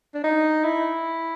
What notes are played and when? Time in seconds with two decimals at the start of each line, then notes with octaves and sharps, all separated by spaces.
0.14 D4
0.24 D#4
0.64 E4